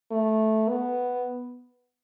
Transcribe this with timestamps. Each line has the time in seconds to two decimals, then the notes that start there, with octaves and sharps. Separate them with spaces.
0.11 A3
0.69 B3